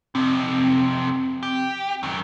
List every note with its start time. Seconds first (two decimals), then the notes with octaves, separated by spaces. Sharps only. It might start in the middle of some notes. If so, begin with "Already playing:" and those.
0.15 F2 C3 C4
1.43 G4
2.03 F#2 D#3